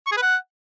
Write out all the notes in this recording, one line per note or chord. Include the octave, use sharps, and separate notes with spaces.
C#6
G#4
B4
F#5